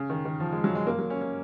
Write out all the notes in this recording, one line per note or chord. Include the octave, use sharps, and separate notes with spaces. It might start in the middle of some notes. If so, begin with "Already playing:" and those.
Already playing: C#3
D#3
D#3
F3
G#3
F#3
G#3
A#3
F#3
C#4
C#4